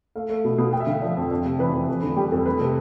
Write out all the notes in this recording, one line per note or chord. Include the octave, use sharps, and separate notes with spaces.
A3 F5
A3
B2
B2
A3 G5
E5
D3 F5
F3 D5
F2
F2
C3
E3 B4
F2
F2
D3
G3 G4
F2 A4
A3 B4
C3 A4